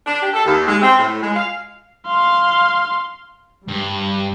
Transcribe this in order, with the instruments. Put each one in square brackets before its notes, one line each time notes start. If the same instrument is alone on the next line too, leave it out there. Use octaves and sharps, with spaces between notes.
[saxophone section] D4
G4
A4
D#2
G#3
C4
A2
G#3
F5
[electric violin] F5 C6
[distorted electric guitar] G2 [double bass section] G3